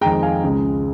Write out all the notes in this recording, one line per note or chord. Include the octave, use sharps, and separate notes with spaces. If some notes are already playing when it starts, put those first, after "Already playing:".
F2 D#3 G#3 G5 A#5
F5 G#5
C#2 C#3 G#3